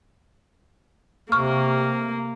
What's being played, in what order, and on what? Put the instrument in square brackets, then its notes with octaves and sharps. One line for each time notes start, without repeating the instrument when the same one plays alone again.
[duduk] C3 [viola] A#3 [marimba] C#6 F6